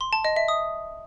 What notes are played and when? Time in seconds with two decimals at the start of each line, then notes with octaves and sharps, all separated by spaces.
0.01 C6
0.13 A5
0.25 D#5
0.36 E5
0.48 D#6